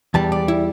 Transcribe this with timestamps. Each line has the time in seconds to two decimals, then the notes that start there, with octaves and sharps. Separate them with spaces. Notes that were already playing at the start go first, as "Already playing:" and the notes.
0.14 E2 E3 G3 A5
0.32 D5
0.48 E4